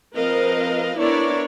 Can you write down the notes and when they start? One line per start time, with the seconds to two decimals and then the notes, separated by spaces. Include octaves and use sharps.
0.15 F3 C4 A#4 B4 D#5 F5
0.98 B3 D4 E4 A#4 C#5 D5